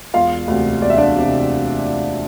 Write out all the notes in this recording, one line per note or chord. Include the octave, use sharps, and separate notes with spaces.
E1 F4 F5
D2 C3
E1 D5
E5
D4 D5
C3